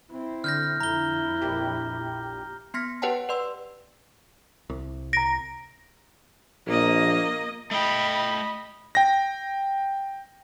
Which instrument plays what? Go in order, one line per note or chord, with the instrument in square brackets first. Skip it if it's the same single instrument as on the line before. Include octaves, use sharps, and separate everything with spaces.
[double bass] C4 E4
[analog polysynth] D3 [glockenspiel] F6 G6 A#6
[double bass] F2 E4 [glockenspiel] A#5 G7
[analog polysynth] A#1 A#2 G4
[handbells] B3 C6 F6 A#6 B6 C#7
G4 B4 C#5 F#5 G5 A5
B4 D5 C6 E6
[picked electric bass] C2
[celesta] A#5 D7 [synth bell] A#6
[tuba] A#1 [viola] A#3 D#5
[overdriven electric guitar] A3 G5 [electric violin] D#5 B5
[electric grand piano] G5 A#6